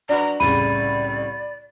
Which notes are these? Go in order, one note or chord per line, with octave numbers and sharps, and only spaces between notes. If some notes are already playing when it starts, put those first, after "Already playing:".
D4 F#4 B4 A#5
C2 A2 C#3 D5 B5 D#7